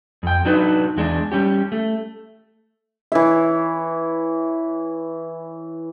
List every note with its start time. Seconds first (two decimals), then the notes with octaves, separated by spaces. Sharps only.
0.23 F2 G5
0.45 F#3 D4 D#4 B4
0.96 E2 G#3 D4
1.32 G3 C#4 G4
1.72 A3
3.12 E3 C#5 E5